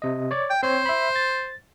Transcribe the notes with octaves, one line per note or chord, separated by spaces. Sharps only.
C3 D#5
C#5 D5
G5
C4 C5 C#5
E5 B5
A6